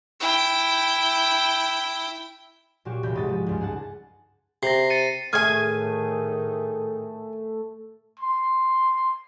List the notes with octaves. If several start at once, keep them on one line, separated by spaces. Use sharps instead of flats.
E4 G5
A#2 F#3 A#3 F#4 G4
E1 C2 B5 G6
G#2 D#6 A6 B6
F3 G#3
C#2 G2
G#4 F#5 A5
C3 A#6 C7
A6 C#7 D#7
A2 D#3 A3 G#4 G#5 F6 G#6
C6